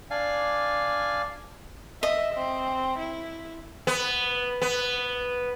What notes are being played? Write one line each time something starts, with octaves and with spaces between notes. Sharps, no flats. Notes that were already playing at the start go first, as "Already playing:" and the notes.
D4 D5 F5 G#5
D#5 E5
C4
E4
B3
B3